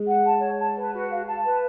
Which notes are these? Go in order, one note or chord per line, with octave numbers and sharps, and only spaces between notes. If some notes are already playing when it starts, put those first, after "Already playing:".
Already playing: G#3
F#5
A5
C#5
A5
B4
F#4
F5
A5
B4